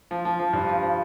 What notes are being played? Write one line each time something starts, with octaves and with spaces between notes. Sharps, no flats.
F3
F3
F3
G2
F3
F3